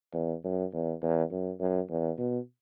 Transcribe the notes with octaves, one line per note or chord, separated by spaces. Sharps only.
E2
F#2
E2
E2
F#2
F#2
E2
B2